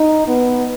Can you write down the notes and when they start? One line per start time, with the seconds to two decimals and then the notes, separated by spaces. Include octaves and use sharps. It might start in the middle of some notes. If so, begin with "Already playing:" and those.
Already playing: D#4
0.28 B3